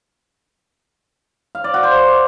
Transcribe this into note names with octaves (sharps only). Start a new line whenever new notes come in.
F5
D5
F#4
C5